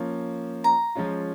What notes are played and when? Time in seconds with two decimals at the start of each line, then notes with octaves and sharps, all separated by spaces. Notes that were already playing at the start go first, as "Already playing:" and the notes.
Already playing: F3 A#3 C#4
0.64 A#5
0.95 F3 G#3 C#4 F4